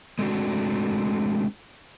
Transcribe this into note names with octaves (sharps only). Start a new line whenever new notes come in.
G#3 A3 C4 D4 F#4